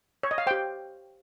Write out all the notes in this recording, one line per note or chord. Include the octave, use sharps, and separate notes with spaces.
C#5
D#5
F5
G4 C5 G5